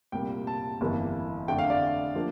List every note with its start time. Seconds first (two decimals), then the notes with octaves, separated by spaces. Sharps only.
0.12 C2 A#2 G3 A#3 G5
0.47 A5
0.80 G1 F2 E3 A#3
1.48 F2 D3 A3 D4 G5
1.59 F5
1.70 D5
2.15 F3 A#3 D4